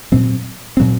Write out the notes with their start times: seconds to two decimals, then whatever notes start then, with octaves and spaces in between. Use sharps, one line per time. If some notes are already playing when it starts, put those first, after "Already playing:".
0.12 A#2 F#3 C4
0.77 A#2 F#3 C4